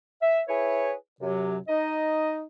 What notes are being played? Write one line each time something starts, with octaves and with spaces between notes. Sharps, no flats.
E5
E4 G#4 B4 C#5
F#2 C3 F#3
D#4 D#5